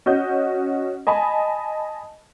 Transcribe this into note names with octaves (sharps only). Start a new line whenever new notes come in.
C#4 F#4 D#5 G6
D#5 G#5 A5 B5